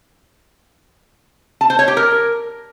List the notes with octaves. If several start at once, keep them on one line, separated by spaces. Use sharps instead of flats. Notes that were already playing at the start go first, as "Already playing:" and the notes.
A5
C5
C#5
G4
A#4